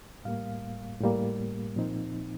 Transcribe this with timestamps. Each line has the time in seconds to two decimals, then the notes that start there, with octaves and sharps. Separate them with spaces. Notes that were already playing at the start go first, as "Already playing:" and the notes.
0.25 A2 G3 A#3 F5
1.00 A2 G3 A#3
1.76 A#2 F3 C4 D#4